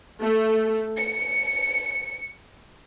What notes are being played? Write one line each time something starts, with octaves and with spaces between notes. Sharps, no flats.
A3
C#7